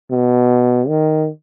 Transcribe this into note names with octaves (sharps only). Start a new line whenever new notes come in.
B2
D#3